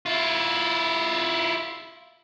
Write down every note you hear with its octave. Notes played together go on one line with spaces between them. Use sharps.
E4 F4